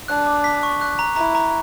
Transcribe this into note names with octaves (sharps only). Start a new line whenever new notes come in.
D4 F#6
D6
B6
C#6
F#6
A#5
E4 A#5
A#5